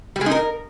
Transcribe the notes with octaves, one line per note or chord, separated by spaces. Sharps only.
G3
G#3
D#4
A#4